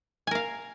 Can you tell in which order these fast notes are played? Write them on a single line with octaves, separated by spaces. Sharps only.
G#5 A#4 F5